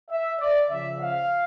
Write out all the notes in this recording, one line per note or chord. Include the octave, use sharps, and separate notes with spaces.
E5
D5
C#3 F3 E5
F5